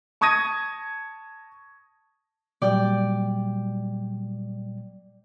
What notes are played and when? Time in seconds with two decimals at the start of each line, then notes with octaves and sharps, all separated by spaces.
0.21 A5 C#6 D#6 G#6 A#6 D#7
2.62 A#2 F#3 G3 D5 G5